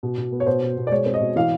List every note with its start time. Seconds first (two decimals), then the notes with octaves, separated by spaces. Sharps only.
0.03 B2
0.18 B2
0.32 B3
0.40 C#5
0.46 B2 C5
0.62 B2
0.77 B2
0.87 D5
0.91 G#3 C#5
1.06 C4
1.14 D#5
1.21 B2
1.36 E3 F5